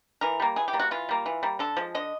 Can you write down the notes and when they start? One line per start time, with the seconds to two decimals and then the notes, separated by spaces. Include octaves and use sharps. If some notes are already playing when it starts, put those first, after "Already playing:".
0.21 E3 A#4
0.40 G3 A#3
0.56 E3 G#4
0.68 G4
0.73 G3 A#3
0.79 F#4
0.91 E3 F4
1.09 G3 A#3
1.26 E3
1.43 G3 A#3
1.59 D3 A4
1.77 F3 G#3
1.95 D3 D#5